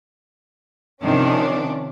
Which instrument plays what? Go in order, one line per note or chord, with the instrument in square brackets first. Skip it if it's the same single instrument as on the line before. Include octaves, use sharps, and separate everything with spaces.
[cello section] C3 D#3 F3 [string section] C#4 D4